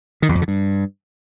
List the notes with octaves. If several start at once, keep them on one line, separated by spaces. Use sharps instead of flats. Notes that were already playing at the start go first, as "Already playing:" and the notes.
D#3
E2
F2
D3
G2